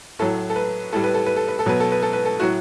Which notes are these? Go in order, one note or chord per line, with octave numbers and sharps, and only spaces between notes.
A2 F#3 A4
A4
B4
A2 G3 A4
B4
A4
B4
A4
B4
A4
B2 F#3 B4
A4
B4
A4
B4
A4
A2 F#3 F#4